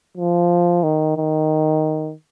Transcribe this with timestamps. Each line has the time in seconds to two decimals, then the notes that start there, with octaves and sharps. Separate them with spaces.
0.17 F3
0.83 D#3
1.17 D#3